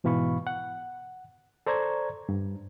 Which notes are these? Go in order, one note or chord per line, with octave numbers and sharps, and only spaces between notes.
G#2 B2 E3 F5 B5 C#6
F#5
A4 C5 D5 A#5 C#6 G#6
G2